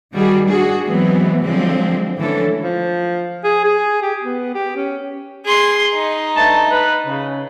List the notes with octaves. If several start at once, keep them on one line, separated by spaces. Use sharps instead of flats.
D#3 G3 F#4 G#4
D4 F#4 G#4
E3 F#3 G#3 B3 C4
D3 F3 F#3 G#3 C4
D3 E3 A3 C#4 A4
F3
G#4
G#4
G4
B3
G4
C#4
G#4 C6
D#4
G2 A3 A5
B4
C#3